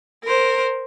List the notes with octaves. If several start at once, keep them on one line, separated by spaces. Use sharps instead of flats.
A#4 C5